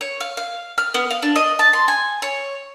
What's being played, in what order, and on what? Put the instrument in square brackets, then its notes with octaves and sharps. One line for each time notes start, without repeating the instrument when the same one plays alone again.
[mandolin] C#5
F5
F5
F6
B3
F5
D4
D#5
A5
C6
G#5
C#5